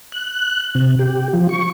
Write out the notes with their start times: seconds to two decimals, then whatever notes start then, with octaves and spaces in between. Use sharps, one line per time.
0.12 F#6
0.75 C3
0.99 G4
1.33 F3
1.49 C#6